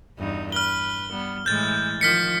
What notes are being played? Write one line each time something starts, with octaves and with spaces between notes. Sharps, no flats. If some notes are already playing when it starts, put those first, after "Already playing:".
E2 G2 D#4
B4 F6 G7
G3 B3
A2 E3 G#3 G6 A6
D#3 F3 F6 B6 C#7